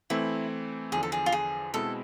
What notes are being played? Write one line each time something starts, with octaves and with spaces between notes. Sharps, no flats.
E3 A3 C4 E4
E2 D3 F3 G#4
A4
G#4
F4
G#4
B2 G#3 C4 E4 A4